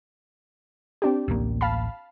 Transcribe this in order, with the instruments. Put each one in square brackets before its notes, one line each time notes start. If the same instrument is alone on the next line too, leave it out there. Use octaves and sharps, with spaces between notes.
[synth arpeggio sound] C4 D4 G4
[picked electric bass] D1 A1 A#3
[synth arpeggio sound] F5 A5 B5